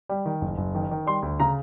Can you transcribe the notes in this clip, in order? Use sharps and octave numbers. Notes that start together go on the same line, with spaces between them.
G3
D#3
F#1
F#1
D#3
D#3
G3 C6
D2
C#3 A#5